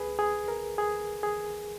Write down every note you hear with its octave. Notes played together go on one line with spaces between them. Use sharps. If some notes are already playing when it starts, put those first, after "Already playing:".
Already playing: C#2 G#4 B4
G#4
A#4
G#4
G#4